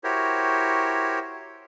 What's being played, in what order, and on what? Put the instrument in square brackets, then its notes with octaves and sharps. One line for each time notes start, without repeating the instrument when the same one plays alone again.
[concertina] E4 F#4 G4 A#4 C5 C#5